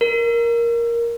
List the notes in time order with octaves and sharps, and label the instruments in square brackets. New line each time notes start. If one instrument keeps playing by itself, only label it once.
[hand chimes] A#4